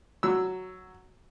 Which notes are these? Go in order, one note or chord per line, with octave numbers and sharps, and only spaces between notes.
F#3 E6